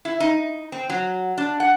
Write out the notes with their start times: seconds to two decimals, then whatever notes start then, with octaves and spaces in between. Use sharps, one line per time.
0.05 E4
0.20 D#4
0.72 C4
0.90 F#3
1.38 D4
1.60 F#5